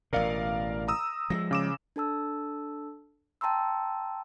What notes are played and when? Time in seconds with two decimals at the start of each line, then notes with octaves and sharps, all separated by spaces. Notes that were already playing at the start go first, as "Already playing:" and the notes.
0.13 A1 B2 A#4 D5 F5
0.88 A#5 D#6 E6
1.30 F3 G3 G#3 A#6
1.51 C#3 D6 E7
1.96 D4 A4 A5 E6
3.41 G5 A5 A#5 C6 E6